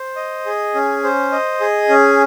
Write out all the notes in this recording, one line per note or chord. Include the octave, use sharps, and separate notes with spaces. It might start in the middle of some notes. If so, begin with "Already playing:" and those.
Already playing: C5
D#5
G#4
C#4
C5
D#5
G#4
C#4